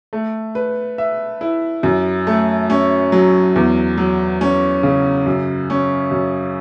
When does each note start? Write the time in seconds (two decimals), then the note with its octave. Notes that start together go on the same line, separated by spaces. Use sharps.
0.13 A3
0.55 B4
0.98 E5
1.41 E4
1.83 F#2
2.27 A3
2.70 C#4
3.12 F#3
3.56 E2
3.97 F#3
4.41 C#4
4.83 C#3
5.26 F#2
5.70 C#4
6.11 F#2